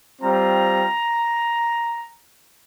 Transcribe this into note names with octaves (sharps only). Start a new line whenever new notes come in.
G3 C4 F4 A#5